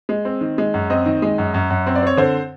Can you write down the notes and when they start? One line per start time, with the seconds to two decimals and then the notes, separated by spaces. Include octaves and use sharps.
0.09 G#3
0.25 C4
0.41 D#3
0.58 G#3
0.74 F#2
0.90 C4 D#5
1.06 D#3
1.22 G#3
1.38 F#2
1.54 F#2
1.70 F#2
1.87 C4
1.95 D5
2.02 C4 C#5
2.17 D3 C5